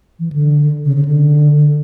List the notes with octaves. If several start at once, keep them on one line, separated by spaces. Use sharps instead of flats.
E3
D3
C#3
C#3
D3